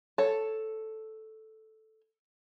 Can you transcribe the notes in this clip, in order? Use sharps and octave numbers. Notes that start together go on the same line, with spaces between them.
A4 C#5